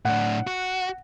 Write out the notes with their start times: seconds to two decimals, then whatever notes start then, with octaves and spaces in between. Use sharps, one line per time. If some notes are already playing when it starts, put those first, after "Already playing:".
0.05 A2 D4 F#5
0.47 F#4